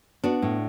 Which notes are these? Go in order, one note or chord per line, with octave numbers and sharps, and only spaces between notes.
B3 D4 F#4
A2